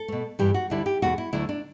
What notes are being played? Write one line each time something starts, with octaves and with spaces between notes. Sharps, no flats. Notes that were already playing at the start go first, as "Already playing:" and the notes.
Already playing: A4
B2 A3
G2 E3 G3 G4
F#4
D2 D3 G3 E4
G4
E2 B2 A3 F#4
E4
D2 D3 F#3 A3 E4
D4